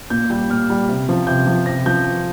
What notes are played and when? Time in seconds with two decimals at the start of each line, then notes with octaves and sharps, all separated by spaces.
0.10 A#2 G6
0.30 G3 G6
0.50 A#2 F6
0.70 G3
0.89 C3
1.09 F3
1.27 C3 G6
1.47 F3
1.66 C3 A#6
1.86 F3 G6